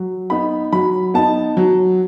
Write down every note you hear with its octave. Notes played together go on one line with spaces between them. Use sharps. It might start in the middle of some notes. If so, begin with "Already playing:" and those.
Already playing: F#3
B3 D#4 B5
F#3 B5
B3 D#4 A5
F#3